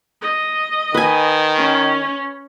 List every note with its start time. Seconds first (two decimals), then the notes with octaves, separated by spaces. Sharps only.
0.22 D#5
0.94 D#3 B4 G#5
1.58 C#4